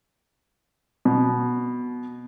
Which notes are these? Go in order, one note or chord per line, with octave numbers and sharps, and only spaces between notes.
B2